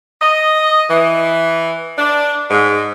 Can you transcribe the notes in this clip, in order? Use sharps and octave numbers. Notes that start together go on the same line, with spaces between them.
D#5
E3
D4
G#2